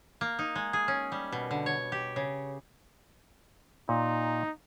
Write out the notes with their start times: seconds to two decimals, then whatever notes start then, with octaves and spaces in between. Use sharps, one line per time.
0.21 A#3
0.39 D#4
0.55 G#3
0.73 G#4
0.88 C#4
1.12 G3
1.32 B2
1.51 D3
1.66 C#5
1.92 G4
2.16 C#3
3.89 A#2 D#4